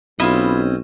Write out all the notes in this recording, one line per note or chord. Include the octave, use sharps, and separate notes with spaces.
B1 C4 C#4 E4 F4 D#5